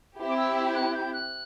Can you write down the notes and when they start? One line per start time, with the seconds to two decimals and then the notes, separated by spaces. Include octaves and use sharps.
0.18 C4 E4 G4
0.28 D6
0.37 E6
0.55 E6
0.69 G6
0.74 F#6
0.94 G6
1.13 F#6